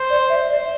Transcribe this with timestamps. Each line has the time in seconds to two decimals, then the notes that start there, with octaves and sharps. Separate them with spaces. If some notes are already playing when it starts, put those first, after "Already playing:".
Already playing: C5
0.10 D5
0.30 E5
0.49 D5